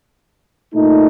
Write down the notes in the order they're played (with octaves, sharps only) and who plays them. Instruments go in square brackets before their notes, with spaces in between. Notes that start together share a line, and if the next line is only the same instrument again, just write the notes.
[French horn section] A#2 A3 D#4